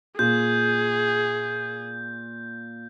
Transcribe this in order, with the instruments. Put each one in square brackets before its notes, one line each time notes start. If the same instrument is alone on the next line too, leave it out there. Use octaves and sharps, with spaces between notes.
[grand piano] A#2 [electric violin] G#4 [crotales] G6